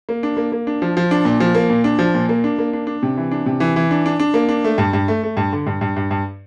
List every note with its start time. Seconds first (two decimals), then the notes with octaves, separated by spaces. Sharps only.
0.09 A#3
0.23 D4
0.37 A#3
0.52 A#3
0.67 D4
0.82 F3
0.97 F3
1.11 D4
1.25 A#2
1.40 F3
1.55 A#3
1.70 A#2
1.84 D4
1.99 F3
2.14 A#2
2.29 A#3
2.44 D4
2.59 A#3
2.73 D4
2.87 D4
3.03 C3
3.17 E3
3.31 D4
3.46 C3
3.60 E3
3.76 E3
3.91 D4
4.06 D4
4.20 D4
4.34 A#3
4.49 D4
4.64 A3
4.78 G2
4.93 G2
5.08 A3
5.23 A3
5.37 G2
5.53 D3
5.67 G2
5.81 G2
5.97 G2
6.11 G2